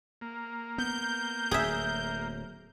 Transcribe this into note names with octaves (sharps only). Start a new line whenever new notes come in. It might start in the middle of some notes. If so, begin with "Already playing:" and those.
A#3
B3 G6
D1 G#4 E5